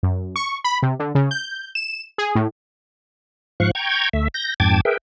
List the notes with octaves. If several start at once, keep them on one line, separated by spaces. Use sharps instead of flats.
F#2
C#6
B5
C3
D3
C#3
G6
E7
G#4
A2
G#2 F3 F5 C#6 F#6
G5 A#5 C#6 G6 G#6
D2 A3 E5
G6 A#6
F2 G#2 G5 A5 D6 G#6
G#4 A#4 B4 E5 G5